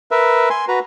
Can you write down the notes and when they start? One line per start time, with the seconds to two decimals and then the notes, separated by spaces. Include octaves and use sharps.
0.11 A#4 B4 E5
0.50 G#5 C6
0.68 F#4 B4 A#5